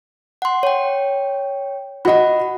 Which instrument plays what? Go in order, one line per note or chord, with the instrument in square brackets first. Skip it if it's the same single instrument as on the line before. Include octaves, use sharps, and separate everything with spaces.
[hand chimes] F#5 C6
C#5 G5
[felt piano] F#4 D#5 [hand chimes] F#5 B5